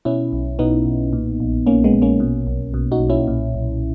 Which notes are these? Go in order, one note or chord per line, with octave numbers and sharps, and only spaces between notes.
B2 C#4 E4
B1
B2 B3 D#4
B1
A#2
A#1
A#2 A#3 C#4
G#3 B3
A#1
A#3 C#4
B2
B1
B2
D#4 F#4
B1
C#4 E4
A#2
B1